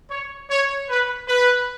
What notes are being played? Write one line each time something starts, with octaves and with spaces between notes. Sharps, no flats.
C#5
C#5
B4
B4